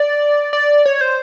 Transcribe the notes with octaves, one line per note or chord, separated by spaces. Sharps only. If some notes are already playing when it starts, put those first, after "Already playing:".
Already playing: D5
D5
C#5
C5